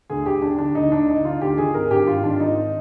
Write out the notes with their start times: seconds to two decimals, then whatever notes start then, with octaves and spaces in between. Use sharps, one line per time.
0.10 D2 G#4
0.26 D2 G4
0.42 D3 D4
0.58 D3 D4
0.75 D2 D#4
0.92 D2 D4
1.08 D3 D#4
1.25 D3 F4
1.41 D2 G4
1.58 D#3 G#4
1.74 G#1 A#4
1.91 G2 G4
2.07 G#1 F4
2.24 D#3 D4
2.40 G#1 D#4